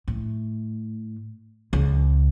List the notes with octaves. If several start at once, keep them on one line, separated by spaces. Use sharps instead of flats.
A2
C#2